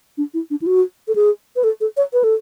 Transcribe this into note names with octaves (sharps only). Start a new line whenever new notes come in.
D4
E4
D4
E4
F#4
A4
G#4
B4
A4
A4
C#5
B4
A4